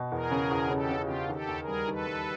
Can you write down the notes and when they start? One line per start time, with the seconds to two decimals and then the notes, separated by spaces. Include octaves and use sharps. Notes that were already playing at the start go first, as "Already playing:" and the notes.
Already playing: B2
0.11 E2 G#4 A#4
0.31 C#3
0.51 E2
0.70 C#3 G4 A4
0.90 C#3
1.00 F4 G4
1.09 C#3
1.29 D#3 G4 A4
1.48 D#2
1.58 G#4 A#4
1.68 G3
1.88 D#3 A4 B4
2.07 G3